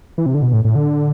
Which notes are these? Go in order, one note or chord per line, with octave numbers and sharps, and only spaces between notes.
E3
C3
D3
B2
A2
A2
D3